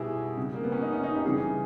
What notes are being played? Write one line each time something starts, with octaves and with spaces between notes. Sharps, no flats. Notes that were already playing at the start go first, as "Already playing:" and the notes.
Already playing: B2 G3 E4 G4 G#4
C#3 G3
A#3
B3
C#4
D#4
C#4
D#4
G4
C#3 E3 G3 G#4